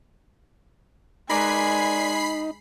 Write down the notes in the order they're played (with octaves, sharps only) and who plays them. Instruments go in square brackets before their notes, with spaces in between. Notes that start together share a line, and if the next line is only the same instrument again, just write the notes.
[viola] G#3 G#5 [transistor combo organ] D#4 [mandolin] A#4 B4 D5 [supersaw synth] B5 C7